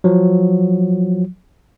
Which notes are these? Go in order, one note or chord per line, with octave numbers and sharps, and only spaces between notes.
F3 F#3